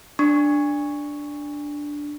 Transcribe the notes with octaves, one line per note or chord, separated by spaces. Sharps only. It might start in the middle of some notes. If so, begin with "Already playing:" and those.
D4 C#6